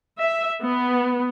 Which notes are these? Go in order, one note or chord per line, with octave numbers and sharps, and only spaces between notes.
E5
B3